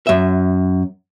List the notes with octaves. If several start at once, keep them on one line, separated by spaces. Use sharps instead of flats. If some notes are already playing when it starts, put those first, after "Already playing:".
F#2 E5